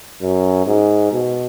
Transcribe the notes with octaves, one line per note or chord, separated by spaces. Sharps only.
F#2
G#2
B2